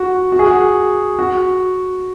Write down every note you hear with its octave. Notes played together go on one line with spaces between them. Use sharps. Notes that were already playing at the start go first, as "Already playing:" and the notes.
Already playing: F#4
F#4
G#4
F#4
F#4